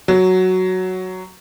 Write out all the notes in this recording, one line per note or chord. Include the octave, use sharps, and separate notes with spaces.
F#3